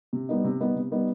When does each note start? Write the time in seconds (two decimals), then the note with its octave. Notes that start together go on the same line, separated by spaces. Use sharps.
0.13 C3
0.29 G3 B3 D#4
0.44 C3
0.60 G3 B3 D#4
0.75 C3
0.92 G3 B3 D#4